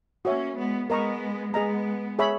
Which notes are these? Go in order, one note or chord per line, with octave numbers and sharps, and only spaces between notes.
A#3 C#4 F#4 C#5 E5
G#3 B3
G#3 B3 A#4 D#5 A#5 C#6
G#3 B3 G#4 D#5 A#5
G#4 C#5 E5 B5